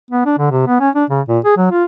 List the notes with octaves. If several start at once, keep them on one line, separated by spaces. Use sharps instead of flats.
B3
D4
D3
C3
B3
C#4
D4
C#3
A#2
G#4
F#3
F4